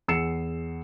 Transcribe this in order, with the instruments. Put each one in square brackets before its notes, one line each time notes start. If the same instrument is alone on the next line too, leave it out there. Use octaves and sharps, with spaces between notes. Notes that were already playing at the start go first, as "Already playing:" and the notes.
[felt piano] E2 G#4 E6 C7 C#7 E7